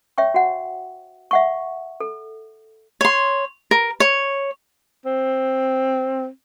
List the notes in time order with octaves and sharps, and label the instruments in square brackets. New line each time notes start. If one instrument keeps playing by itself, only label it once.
[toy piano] C#5 E5 G5 C#6
F#4 F#5
E5 F#5 C#6
A4
[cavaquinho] C#5 C6
A#4
C#5
[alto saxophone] C4